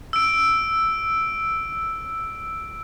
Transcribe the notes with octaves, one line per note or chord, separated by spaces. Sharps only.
E6 D7